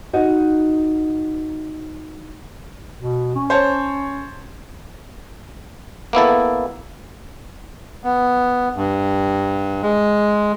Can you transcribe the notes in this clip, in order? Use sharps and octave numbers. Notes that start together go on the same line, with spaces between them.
D#4 F#4 D#5
B2
C#4
C5 C#5 A5
A#3 B3 E4 A4
B3
G2
G#3